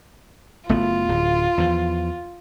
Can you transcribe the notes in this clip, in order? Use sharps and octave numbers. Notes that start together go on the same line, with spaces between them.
F#1 A3 B3 F4
D1
E2 F3